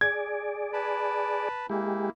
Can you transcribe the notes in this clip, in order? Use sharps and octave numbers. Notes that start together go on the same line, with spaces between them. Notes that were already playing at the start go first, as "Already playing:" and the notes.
G#4 D5 G#6
B4 A5 B5
G#3 A#3 E4 G4